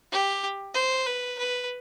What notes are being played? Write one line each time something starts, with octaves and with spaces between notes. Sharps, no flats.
G4
C5
B4
B4